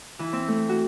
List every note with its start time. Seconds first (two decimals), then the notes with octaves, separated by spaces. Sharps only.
0.19 E3
0.33 C4
0.48 A3
0.69 F#4